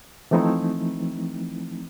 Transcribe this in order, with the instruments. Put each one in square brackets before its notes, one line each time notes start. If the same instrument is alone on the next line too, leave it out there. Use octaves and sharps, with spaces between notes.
[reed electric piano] E3 F3 A3 C4 D#4 E4